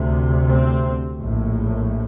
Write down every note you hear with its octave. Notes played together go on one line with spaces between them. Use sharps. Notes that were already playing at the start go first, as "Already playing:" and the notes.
Already playing: D2 C3
C4
A#1 A2